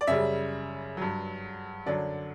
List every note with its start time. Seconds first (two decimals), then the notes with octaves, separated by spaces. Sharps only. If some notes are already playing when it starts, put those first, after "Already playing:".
0.01 D5
0.07 F#2 C#3 G3 E5
0.97 G2 F#3
1.86 F#2 D3 F#3 D5